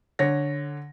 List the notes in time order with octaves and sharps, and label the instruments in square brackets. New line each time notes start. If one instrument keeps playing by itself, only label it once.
[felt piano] D3 C#5 A#6